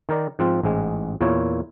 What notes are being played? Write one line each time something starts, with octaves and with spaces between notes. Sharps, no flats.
D#3 A#4 D5
G#2 F3 C4 F4
A1 G#2 G#3
E2 A#2 A#3 E4 F4 C#5